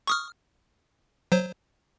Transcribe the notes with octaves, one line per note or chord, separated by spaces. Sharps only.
C#6 D#6 F6
F#3 C5